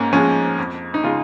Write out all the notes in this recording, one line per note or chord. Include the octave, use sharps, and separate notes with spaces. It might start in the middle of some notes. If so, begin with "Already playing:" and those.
Already playing: G#2 A#3 C#4
F3 G#3 C#4
F2
D#4
C#3 G#3 F4